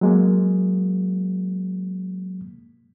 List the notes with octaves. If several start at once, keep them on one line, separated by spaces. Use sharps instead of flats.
F#3 G#3 A#3